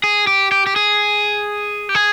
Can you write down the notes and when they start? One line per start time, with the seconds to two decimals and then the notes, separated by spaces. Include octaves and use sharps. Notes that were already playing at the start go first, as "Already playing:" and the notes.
0.04 G#4
0.27 G4
0.52 G4
0.67 G4
0.76 G#4
1.89 G4
1.95 G#4